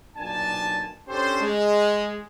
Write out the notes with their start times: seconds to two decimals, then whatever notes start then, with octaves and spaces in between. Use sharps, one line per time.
0.16 B1 A#2 D4 G#5 A5
1.08 C#4 D4 G4 A4 C5
1.40 G#3